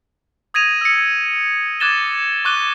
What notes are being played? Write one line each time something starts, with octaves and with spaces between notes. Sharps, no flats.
D#6 G#6 A#6 D#7 F7
E6 C#7
D6 F#6 G#6 A6 E7 G7
C#6 D6 F#6 D#7 G7